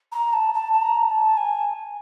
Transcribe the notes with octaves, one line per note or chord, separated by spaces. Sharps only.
A#5
A5
A5
A5
A#5
A5
G#5